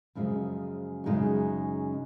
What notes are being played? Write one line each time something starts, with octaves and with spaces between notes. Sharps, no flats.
F#2 C#3 F3 G#3
F#2 C#3 G#3 D#4 F#4